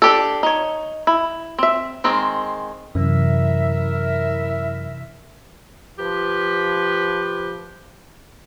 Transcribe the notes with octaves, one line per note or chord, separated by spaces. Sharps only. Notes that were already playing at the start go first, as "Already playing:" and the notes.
D4 G4 A4
D#4 C#5
E4
C4 E5
D#3 G#3 C4
F#2 C3 E3 E4 A#4 E5
F3 G4 B4